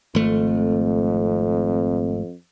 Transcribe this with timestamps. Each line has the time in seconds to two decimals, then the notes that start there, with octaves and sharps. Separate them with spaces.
0.15 G#1 F2 A3